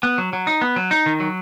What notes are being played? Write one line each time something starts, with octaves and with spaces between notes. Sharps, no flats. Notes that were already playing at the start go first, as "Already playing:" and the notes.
B3
F#3
F#3
D#4
B3
F#3
D#4
D#3
F#3